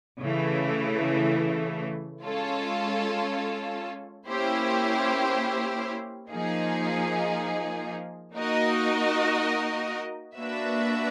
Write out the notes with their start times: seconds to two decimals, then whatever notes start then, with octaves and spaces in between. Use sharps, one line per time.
0.20 C#3 E3 A3
2.23 G#3 C#4 F4 A4
4.27 A#3 C#4 E4 G4 C5
6.31 F3 A#3 D#4 G#4
8.33 A#3 D#4 F#4 A#4 D#5
10.36 A#3 D4 F#4 B4 E5